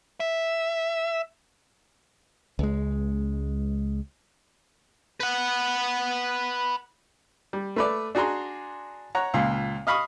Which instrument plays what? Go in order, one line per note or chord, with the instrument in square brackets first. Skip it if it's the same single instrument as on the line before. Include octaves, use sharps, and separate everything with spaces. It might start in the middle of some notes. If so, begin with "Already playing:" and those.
[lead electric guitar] E5
[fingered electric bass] C#2 G#3
[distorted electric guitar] B4 F#5
[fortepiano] G3
A3 B4 D5
D4 F#4 G#4 A#5 C6
C#5 F#5 A#5
C#2 A#2
D#5 F5 B5 C#6 D#6